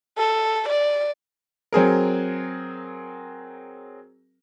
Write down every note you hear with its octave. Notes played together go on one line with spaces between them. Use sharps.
A4
D5
F#3 C4 G#4 A#4